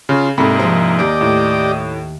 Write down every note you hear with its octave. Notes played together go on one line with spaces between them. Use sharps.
C#3 F4 C6
C2 G#2 A#3 C4 A4 B5
F3 G#4 C5
D#2 A#3 G4 D5 D#5
A2